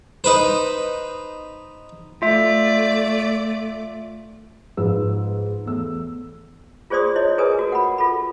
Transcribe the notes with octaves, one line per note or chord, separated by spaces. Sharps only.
D#4 B4 C5
A3 F4 D5 E5
G#2 F3 B4 E6
E2 A3 E6
F4 G#4 C5 D5 C6 D#6
E4 C#5 D#5
G#4 A#4 B4 G#5 D#6
F#4 A#4
F#5 B5
F4 A4 B5